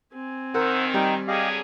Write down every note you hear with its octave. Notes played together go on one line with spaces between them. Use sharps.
C4 G#5
D#3 A#4 C5 F#5 E6
G3 D#4 G5
D3 F#3 G4 G#4 D#5 F5